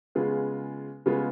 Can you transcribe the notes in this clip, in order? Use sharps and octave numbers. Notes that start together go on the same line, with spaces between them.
C#3 G#3 B3 F4
C#3 G#3 B3 F4